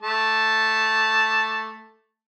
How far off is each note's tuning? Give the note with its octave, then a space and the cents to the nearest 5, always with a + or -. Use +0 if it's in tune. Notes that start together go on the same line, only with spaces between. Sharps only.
A3 +0 A5 +0 D6 +0